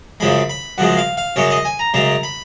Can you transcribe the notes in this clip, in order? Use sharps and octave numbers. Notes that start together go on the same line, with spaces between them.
F#2 C#3 F3 G#3 B5
B5
F#2 C#3 F3 G#3 F#5
F5
F5
F#2 C#3 G#3 C#5
D#5
G#5
A#5
F#2 C#3 G#3 A#5
B5